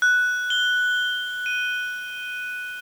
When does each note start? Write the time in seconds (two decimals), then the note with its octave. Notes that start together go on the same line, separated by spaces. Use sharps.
0.02 F#6
0.50 G7
1.46 D#7